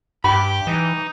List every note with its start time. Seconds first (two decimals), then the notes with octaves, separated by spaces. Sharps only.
0.24 G2 G4 B5
0.67 E3 D#4